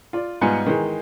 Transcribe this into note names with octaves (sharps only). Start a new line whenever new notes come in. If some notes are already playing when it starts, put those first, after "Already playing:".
F4 D5
G#2 G3 B3 F4 G#5 C#7
D#3 E3 G#3